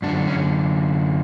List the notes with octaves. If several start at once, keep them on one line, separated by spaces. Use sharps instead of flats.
F#2 D3 D4
C#4